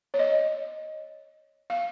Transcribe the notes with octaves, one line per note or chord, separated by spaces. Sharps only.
C#5
D#5
F5